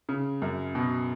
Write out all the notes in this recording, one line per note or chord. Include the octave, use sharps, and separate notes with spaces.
C#3
F#2
B2